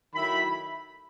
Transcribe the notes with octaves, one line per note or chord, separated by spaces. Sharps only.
D#3 F#3 A3 E4 B5